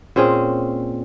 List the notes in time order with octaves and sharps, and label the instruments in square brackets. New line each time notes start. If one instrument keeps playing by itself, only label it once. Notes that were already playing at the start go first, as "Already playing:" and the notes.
[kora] A#2 C4 C#4 G#4